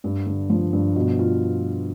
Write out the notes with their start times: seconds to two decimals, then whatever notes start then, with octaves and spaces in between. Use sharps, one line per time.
0.04 G2
0.26 D3
0.50 F3
0.73 G2
0.96 B2
1.19 F4